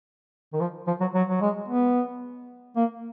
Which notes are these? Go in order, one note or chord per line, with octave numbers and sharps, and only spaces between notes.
D#3
F3
F3
F#3
F#3
F#3
G#3
B3
A#3